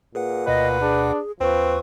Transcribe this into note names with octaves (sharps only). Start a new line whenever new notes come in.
A#2 G#4 B4 F#5
D2 B2 B4 D#5 F#5
D4 G#4
D#2 F3 C4 B4 C#6